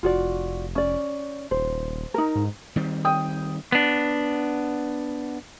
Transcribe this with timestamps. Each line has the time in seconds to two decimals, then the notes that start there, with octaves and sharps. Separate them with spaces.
0.03 F1 F4 F#4 D5
0.75 C#4 D5
1.51 D#1 C5
2.14 D#4 A#4
2.35 G#2
2.76 D#3 G3 C4
3.05 G5 D#6
3.72 B3 D4